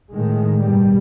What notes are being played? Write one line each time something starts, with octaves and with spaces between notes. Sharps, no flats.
A2 D#3 G#3
G2 B2 G3